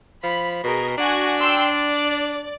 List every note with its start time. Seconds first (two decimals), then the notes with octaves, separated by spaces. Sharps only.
0.23 F3 B5
0.63 B2 G#4 A#4
0.98 D4 F#4 G#5
1.39 G5 C6 E6
1.71 D5